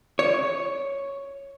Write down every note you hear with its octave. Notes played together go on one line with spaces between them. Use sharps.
C#5